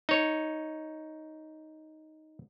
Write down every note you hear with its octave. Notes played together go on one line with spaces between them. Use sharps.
D#4 C#5